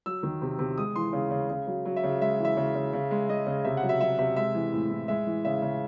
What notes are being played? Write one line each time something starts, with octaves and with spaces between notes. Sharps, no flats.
F#3 E6
D#3
C3
C3
G#3 D#6
E3 C6
C#3
C#3
C#3
F#3
F#3
E5
C#3
G#3 E5
E3
E5
C#3
C#3
C#3
G#3
G#3 D#5
C#3
C3 E5
F#5
F#3
E5
F#3 E5
C3 E5
G#3 E5
E3
A2
A2
G#3 E5
E3
C#3 E5
C#3